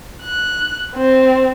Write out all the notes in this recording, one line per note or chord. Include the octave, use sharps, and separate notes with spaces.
F#6
C4